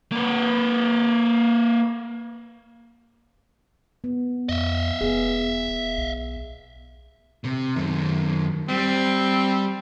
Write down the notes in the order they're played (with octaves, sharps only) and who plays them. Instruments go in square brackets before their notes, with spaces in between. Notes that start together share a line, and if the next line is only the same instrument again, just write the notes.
[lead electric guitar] A#3 B4
[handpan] B3
[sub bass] F2 [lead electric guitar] D#5 E5
[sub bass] E1 [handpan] B3 G#4
[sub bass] B1
[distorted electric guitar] C3
F#2 D#3
[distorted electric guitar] G3 [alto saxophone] C4